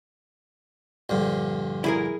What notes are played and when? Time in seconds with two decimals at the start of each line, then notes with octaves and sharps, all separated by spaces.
1.09 A#1 G2 D3
1.84 E4 G#4 A#4